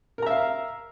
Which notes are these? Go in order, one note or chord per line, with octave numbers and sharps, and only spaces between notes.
A#4 E5 F5 A#5